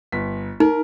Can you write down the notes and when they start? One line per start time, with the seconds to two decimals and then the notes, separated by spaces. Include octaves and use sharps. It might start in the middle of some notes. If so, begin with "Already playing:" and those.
0.12 G1 B6
0.60 D#4 A#4